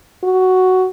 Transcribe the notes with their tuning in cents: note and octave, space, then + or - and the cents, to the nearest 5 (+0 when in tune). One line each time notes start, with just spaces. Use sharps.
F#4 +5